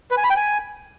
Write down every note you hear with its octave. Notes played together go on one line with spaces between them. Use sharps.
B4
G#5
B5
G5
G#5